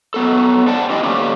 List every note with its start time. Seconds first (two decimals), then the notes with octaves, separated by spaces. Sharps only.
0.14 F#3 B3 A4
0.67 C5 D5 F#5 G5 A5
0.90 F#3 C#4 D4 E4 G4 D#5
1.04 D3 A#3 C#4 G4